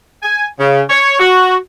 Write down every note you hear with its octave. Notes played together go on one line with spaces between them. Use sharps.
G#5
C#3
C#5
F#4